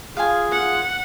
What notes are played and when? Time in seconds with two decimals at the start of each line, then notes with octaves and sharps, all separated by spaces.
0.17 F4 G#4 F5 G#5
0.52 F#5